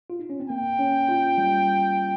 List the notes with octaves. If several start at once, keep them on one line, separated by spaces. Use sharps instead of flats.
F4
D#4
C#4
C4
A#3 G5
C#4
F4
G3